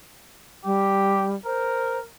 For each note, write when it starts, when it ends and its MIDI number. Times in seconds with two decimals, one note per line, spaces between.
0.65 1.36 55
0.65 1.28 67
1.46 2.04 70
1.46 1.98 72